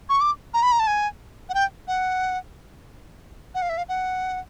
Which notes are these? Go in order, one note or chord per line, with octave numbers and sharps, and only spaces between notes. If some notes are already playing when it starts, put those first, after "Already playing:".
C#6
D6
A#5
B5
A#5
A5
G#5
F#5
G5
F#5
F#5
F5
E5
F5
F#5